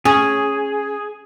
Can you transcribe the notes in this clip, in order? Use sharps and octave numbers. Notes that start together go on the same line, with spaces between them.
C#4 G#4